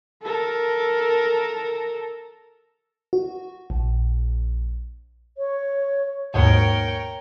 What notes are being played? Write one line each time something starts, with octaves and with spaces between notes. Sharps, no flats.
A4 A#4
F#4
A#1
C#5
D#2 G#2 B2 A#4 C#5 G5